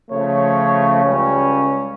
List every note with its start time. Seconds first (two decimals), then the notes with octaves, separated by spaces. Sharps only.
0.11 C#3 F3 A3 C#5
1.04 C#2 G3 C#4